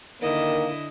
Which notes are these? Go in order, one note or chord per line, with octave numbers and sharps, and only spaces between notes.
D3 D#3 A#3 E4 D#5